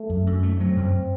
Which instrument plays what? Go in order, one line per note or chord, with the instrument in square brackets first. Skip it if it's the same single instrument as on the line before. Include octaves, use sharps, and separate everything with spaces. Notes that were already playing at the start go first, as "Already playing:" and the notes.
Already playing: [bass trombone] A3
[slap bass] F#2
F#2
A3
[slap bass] F#3 [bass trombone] C4
[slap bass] F#2